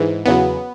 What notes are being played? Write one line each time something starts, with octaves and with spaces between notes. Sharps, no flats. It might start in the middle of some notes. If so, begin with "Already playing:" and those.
Already playing: G#2 E3
E2 C#3 F#3 B3